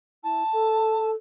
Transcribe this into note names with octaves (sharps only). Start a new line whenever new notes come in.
E4 A5
A4